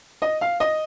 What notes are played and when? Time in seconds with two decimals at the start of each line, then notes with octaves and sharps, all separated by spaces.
0.22 D#5
0.41 F5
0.60 D#5